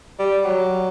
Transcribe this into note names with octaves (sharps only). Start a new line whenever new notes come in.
G3
F#3